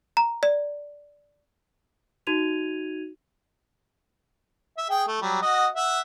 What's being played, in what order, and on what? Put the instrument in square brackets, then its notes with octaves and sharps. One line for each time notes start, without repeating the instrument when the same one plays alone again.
[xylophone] A#5
D5
[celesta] D#4 F#4 G#6 D#7 F7
[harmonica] E5
G#4 G5
A3
F#3 G3
F#4 D#5 F#5
E5 F#5